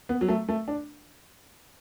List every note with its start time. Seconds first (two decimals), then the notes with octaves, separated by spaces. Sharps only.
0.09 B3
0.21 F#3
0.28 A3
0.48 A3
0.68 D4